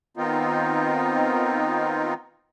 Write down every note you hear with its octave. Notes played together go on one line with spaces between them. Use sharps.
D#3 B3 C4 D#4 F4